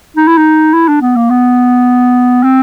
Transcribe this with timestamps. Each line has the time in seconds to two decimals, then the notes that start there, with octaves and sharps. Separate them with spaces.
0.17 D#4
0.28 E4
0.38 D#4
0.74 E4
0.89 D4
1.02 B3
1.16 A#3
1.30 B3
2.43 C4